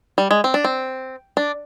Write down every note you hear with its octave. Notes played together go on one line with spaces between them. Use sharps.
G3
G#3
C4
D4
C4
D4